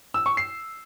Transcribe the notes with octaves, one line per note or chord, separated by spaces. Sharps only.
E6
C#6
C7